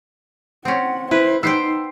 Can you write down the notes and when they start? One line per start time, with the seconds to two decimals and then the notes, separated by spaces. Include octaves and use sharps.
0.65 C4 C#4 F#5
1.11 E4 B4 C5
1.43 B3 D#4 C5 G5 E6 C7